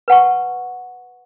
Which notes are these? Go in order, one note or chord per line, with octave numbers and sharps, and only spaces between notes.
B4 F#5 A5 C#6